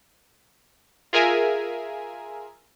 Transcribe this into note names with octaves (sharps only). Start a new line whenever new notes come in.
F4 G#4 A#4 E5 G#5